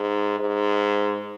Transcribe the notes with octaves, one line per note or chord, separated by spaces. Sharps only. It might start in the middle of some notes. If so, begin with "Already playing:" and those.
Already playing: G#2
G#2